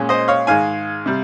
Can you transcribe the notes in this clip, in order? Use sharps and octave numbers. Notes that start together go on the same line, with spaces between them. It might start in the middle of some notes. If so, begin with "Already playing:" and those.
Already playing: A#2 G#3 C#4
C5 D#5
C#5 F5
G#2 D#3 G#3 F5 G#5
C3 G3